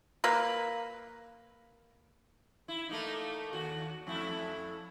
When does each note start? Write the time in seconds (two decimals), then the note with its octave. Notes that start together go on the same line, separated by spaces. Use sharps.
0.24 A#3 B4
2.68 E4
2.89 A3 A#3 D#4
3.53 D#2 F#4
4.07 F2 A3 E4